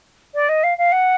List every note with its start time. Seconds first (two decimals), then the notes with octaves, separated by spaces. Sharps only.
0.35 D5
0.49 D#5
0.63 F5
0.78 F5
0.92 F#5